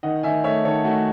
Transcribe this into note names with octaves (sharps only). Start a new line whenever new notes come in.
D#3 D#5 F#5
D#3 E5 G#5
A3 C#5 E5
D#3 A4 C#5
A3 F#4